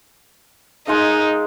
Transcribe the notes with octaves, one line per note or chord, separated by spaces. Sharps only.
G#3 D#4 A#4 F5